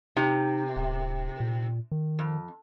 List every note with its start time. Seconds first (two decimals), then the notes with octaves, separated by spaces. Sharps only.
0.17 C3 D#4
0.76 D1
1.40 A#2
1.92 D#3
2.19 F2